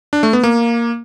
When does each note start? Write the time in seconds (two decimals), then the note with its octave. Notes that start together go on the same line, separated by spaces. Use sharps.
0.13 D4
0.23 A3
0.33 B3
0.43 A#3